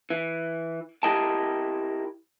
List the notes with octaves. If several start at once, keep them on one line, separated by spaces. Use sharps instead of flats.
E3
E4 G4 A#4 D#5 G5 A5